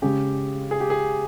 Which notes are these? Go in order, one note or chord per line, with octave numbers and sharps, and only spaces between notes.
C#3 G#3 C#4 G4 G#4
G#4
G4
G#4